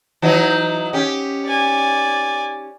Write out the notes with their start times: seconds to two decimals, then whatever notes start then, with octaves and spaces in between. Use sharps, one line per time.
0.22 E3 F#3 D#4
0.93 C#4 G4
1.46 D5 G#5